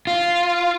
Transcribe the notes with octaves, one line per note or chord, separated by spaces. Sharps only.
F4